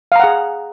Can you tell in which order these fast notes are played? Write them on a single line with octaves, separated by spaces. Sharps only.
F5 A#5 F#5 G#4